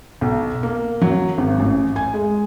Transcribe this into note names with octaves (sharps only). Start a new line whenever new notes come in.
B1
A#3
F#3
G#1
A1
G#5
G#3